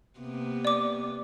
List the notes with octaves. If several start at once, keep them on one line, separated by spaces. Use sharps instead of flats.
C3 A#3 B3
D5 D6